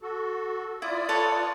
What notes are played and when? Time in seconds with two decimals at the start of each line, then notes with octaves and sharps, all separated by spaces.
0.02 F#4 A4
0.82 E4 F4 D5 D#6
1.09 A4 B4 C#5